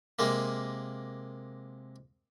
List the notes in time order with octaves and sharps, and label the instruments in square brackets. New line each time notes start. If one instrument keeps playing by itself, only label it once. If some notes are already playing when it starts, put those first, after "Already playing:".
[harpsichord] C3 G#3 A#3